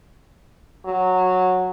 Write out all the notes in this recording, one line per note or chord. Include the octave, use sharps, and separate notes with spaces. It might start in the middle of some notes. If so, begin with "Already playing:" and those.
F#3